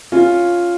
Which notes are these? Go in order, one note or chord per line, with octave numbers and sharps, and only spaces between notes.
C#4 F4